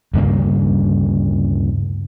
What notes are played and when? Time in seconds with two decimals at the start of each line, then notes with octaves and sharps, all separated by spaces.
0.14 D2 G2 C#3 A#3